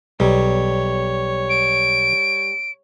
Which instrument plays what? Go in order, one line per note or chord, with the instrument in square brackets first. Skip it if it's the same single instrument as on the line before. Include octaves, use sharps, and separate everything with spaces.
[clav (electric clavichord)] B1 [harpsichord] G3 [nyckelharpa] C#5
[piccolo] D7